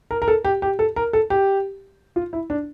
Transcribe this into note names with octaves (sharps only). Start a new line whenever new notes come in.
A#4
A#4
A4
G4
G4
A4
A#4
A4
G4
F4
E4
D4